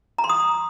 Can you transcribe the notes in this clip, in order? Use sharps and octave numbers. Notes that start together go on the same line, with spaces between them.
A#5
C6
D#6